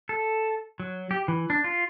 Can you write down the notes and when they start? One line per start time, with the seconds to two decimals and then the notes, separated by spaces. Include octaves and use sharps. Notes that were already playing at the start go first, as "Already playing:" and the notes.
0.09 A4
0.80 F#3
1.11 G4
1.28 E3
1.50 D4
1.64 F4